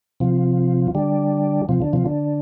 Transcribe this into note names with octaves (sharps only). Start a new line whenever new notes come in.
C3 F3
D3 G3
C3 F3
D3
C3 F3
D3